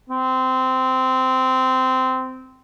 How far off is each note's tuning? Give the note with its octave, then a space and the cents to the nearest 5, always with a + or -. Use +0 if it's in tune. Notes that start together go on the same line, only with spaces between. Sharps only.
C4 -15